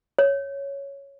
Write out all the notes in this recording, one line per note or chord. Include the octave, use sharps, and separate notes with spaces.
C#5